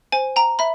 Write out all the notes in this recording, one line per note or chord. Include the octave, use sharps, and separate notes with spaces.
C5 G#5
G5 A#5
E5 B5